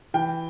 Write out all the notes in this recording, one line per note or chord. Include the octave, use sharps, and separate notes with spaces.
E3 G5